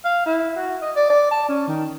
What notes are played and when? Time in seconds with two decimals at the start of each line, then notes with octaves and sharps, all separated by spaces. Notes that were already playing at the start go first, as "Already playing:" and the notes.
0.05 F5
0.26 E4
0.56 F#4
0.82 D#5
0.96 D5
1.09 D5
1.31 A5
1.49 C#4
1.67 D#3